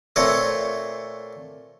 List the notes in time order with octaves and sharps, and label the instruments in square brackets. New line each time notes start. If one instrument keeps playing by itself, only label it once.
[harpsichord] A#2 A3 C4 C#5 E5